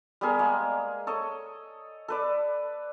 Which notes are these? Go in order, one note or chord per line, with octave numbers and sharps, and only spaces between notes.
G3 B3 G#4 A#4
G#3 A#3
A4 C#5 D#5
A4 B4 D5